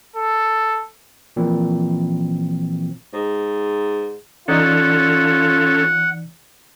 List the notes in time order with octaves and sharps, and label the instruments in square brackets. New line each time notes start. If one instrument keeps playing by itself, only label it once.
[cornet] A4
[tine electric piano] A#2 E3 F3 C4
[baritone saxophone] G#2
[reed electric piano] E3 D#4 D5 [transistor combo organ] C#4 A4 [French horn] F4 [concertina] F#5